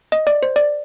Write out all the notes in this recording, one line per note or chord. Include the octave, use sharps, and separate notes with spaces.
D#5
D5
C5
D5